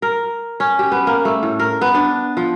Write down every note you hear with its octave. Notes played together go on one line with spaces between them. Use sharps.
A#4
C#4
G4
B3
A#3
A3
A2
A#4
B3
D4
F3